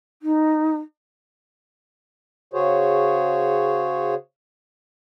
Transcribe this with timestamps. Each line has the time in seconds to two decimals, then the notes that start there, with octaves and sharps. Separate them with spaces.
0.22 D#4
2.53 C#3 F#4 G#4 C5 C#5